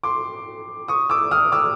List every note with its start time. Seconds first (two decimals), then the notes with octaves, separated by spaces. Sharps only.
0.03 C6 D6
0.88 C#6 D#6
1.10 D6 E6
1.31 D#6 F6
1.52 D6 E6